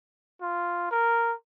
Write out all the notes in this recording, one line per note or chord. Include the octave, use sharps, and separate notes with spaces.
F4
A#4